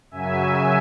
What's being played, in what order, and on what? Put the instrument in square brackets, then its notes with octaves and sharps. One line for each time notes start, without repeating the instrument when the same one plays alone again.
[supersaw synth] F#2 C#3 F#3 E5 G#5